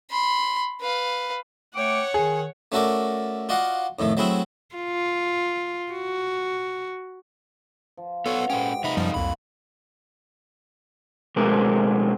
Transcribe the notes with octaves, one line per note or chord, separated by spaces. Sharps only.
B5 C6
B4 F5
A3 C#5 F#5 G5 D6
D#3 G#4
A3 C#4 F#4 A4 A#4 D5
F4 F#4 D5 D#5 F5 F#5
F2 A2 D#3 A3
F#3 A3 C4 E4 F#4 G#4
F4
F#4
F3
B3 F#4 A4 B4 C#5 D5
G#2 C#4 A4 G5 C6
C3 D#4 F4 E5 B5
F#2 A#2 F3 G3 F4
C2 F2 B5
B2 G#3 A3 C4 A#4